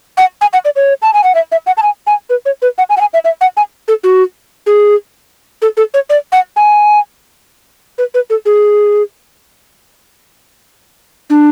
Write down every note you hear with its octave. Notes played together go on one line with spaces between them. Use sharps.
F#5
G#5
F#5
D5
C#5
A5
G#5
F#5
E5
E5
F#5
A5
G#5
G#5
B4
C#5
B4
F#5
G#5
F#5
G#5
E5
E5
F#5
G#5
A4
F#4
G#4
A4
A4
C#5
D5
F#5
G#5
B4
B4
A4
G#4
D4